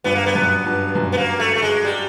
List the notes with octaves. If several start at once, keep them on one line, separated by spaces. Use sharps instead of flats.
G2 B3
A#3
B3
F#2
G2
F#2
B3
A#3
A3
A3
G#3
G3